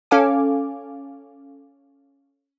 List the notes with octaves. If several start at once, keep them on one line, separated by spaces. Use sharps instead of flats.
C#4 A4 F5 G#5 D6